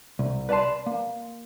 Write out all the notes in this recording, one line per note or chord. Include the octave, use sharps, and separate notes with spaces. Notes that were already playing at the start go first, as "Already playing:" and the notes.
C2
B4 D5 F#5 A5 C6
A#3